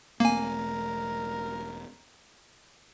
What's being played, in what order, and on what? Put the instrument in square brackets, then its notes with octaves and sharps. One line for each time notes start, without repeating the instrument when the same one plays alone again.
[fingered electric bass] E1 A3 C4 [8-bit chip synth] A#3 G#5 [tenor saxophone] A#4